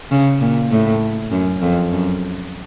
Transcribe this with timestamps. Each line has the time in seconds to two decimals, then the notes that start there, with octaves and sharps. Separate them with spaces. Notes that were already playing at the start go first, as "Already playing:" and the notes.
0.11 C#3
0.41 A#2
0.71 A2
1.31 F#2
1.61 F2
1.92 F#2